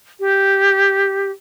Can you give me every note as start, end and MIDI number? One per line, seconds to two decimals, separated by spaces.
0.19 1.31 67